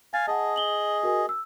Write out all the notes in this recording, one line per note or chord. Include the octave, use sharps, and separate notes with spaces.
F5 G#5 A6
G#4 D#5 F#5 A5
F#7 G7
F#4 A#4 G#5
E6